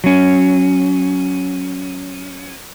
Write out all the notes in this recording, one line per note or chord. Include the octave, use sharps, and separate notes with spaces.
F#3 C#4